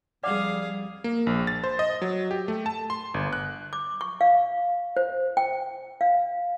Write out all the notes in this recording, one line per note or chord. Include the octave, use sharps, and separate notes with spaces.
F2 G3 G#4 D5 F5 F#5 D6
A#3
A#1
A6
C5
D#5
F#3
G4
A3
A5
C6
G1
F#6
D6
C#6
F5
C5
G5
F5